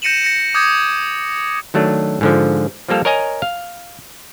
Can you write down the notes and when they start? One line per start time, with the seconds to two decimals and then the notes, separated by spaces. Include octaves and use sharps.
0.02 G6 A#6 C#7 D#7 E7 F#7
0.24 A#6 C#7
0.54 D6 D#6 G6 G#6
1.74 D#3 F#3 A3 D4
2.21 G#2 D3 F3
2.89 F3 G3 A#3 A4 F5
3.05 A#4 C#5 D#5 G#5 A#5
3.42 F5